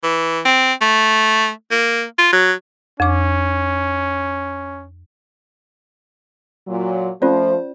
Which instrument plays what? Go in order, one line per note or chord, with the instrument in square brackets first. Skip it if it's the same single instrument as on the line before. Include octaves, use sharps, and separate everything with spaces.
[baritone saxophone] E3
C4
A3
A#3
F4
F#3
[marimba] F2 D6 [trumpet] C#4
[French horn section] A#2 F#3
[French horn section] F3 A3 [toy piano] C#4 F4 D5 [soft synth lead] C5